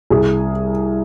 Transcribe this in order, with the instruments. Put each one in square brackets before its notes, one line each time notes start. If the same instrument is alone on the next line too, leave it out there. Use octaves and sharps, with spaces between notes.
[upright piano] C2 G#4